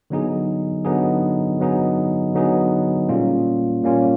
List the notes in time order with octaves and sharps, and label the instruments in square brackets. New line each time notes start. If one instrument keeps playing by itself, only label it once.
[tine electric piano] D3 F#3 B3 D#4 G#4
D3 F#3 B3 D#4 G#4
D3 F#3 B3 D#4 G#4
D3 F#3 B3 D#4 G#4
A#2 G3 A#3 C#4 F4
A#2 G3 A#3 C#4 F4